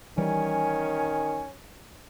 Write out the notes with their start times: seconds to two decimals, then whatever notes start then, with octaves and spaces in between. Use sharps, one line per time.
0.18 D#3 E3 G3 C#4 G#5